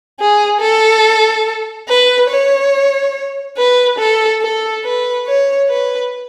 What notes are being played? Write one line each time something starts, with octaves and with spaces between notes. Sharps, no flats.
G#4
A4
B4
C#5
B4
A4
A4
B4
C#5
B4